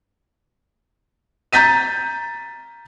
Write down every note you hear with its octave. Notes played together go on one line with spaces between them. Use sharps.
A#5 G6 A6 B6 D#7